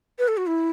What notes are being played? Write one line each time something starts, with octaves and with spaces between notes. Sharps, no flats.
B4
A4
F#4
E4